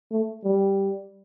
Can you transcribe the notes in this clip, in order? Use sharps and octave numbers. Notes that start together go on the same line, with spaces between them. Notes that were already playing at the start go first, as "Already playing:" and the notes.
A3
G3